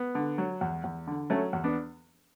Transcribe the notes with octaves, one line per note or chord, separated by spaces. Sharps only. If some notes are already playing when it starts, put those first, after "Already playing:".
Already playing: B3
D3
F#3
E2
E2
D3
F#3 A3 C#4
E2
B3 D4